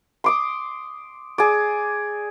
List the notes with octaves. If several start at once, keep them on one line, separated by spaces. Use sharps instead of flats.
C6 D6 D#6
G#4 D5